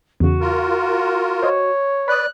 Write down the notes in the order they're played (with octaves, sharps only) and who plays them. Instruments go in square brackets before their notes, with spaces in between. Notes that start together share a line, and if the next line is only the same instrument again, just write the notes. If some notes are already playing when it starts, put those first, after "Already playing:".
[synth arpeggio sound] E2 C#3 [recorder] F#4
[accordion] F4 A#4
[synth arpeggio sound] C5 D#5 [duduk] C#5
[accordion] B4 D5 [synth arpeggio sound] B5 D#6 [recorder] F#6